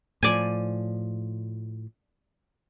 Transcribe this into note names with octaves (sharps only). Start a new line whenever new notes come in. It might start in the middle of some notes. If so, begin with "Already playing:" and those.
A2 F3 D5 G#5